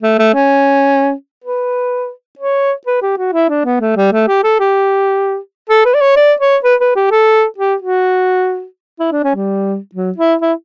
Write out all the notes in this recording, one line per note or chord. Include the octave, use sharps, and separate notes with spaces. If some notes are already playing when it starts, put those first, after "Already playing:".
A3
A3
C#4
B4
C#5
B4
G4
F#4
E4
D4
B3
A3
G3
A3
G4
A4
G4
A4
B4
D5
C#5
D5
C#5
B4
B4
G4
A4
G4
F#4
E4
D4
C#4
G3
F#3
E4
E4